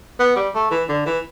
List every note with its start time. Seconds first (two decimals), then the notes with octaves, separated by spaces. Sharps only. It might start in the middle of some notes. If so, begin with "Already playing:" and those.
0.20 B3
0.36 G3
0.55 A3
0.71 E3
0.89 D3
1.06 E3